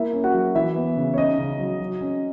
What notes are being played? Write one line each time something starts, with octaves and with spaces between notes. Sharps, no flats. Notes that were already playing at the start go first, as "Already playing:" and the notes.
Already playing: A#3 E4 E5
C#4
F#4 F#5
F#3
E3 E4 E5
B3
C#3
C#5
C#4 D#4 D#5
C#3
F#3
F#3
C#4